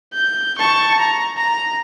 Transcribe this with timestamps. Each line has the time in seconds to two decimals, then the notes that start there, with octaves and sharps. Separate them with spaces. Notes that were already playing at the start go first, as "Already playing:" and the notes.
0.13 G6
0.58 A5 C#6
1.00 A#5
1.37 A#5